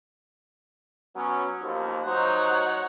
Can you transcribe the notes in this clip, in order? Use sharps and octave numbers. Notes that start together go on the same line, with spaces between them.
F#3 B3 C#4
D#2 F3
F#3 D#4 C5 C#5 F#5